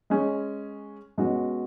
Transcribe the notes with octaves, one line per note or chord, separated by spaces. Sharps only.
G#3 C#4 G#4
B2 G#3 C#4 F#4